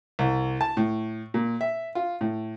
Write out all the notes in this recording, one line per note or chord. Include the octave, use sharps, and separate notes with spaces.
C2
A5
A2
A#2
E5
F4
A2